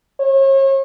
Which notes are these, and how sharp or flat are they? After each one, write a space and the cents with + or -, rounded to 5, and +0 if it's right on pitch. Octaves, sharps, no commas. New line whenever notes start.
C#5 -40